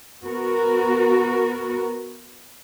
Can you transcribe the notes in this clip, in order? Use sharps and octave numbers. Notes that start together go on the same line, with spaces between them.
B3 F#4 A#4